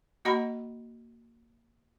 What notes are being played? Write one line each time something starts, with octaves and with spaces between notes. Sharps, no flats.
A#3 F#4 D#5 F#5 A#5 B5